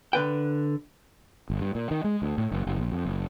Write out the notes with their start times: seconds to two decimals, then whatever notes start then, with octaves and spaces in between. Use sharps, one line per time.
0.13 D3 B4 G5
1.50 G1
1.61 G2
1.75 A#2
1.91 D#3
2.04 G#3
2.22 D2
2.38 A2
2.51 F#1
2.67 F#1
2.78 A#1
2.92 F2
3.05 F#1